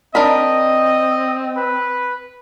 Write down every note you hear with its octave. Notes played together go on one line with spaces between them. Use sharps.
C4 D4 A#4 D#5 B5
B4